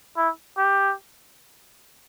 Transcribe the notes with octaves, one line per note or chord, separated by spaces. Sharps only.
E4
G4